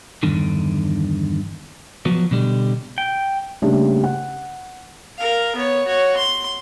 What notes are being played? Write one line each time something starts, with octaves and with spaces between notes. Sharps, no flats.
E2 G2 D3 D#3
F3 F#3 B3
B2 D3 G3
G5
C#3 G3 A3 A#3 D4
F#5
A#4 F5
B3 C#5
F#4 C#5
C6